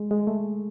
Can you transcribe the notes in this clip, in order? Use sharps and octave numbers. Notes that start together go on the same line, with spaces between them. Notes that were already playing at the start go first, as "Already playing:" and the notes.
Already playing: G#3
G#3
A3